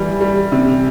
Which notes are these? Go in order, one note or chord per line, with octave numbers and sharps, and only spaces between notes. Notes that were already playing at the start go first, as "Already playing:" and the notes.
Already playing: E3 G3
G3
C3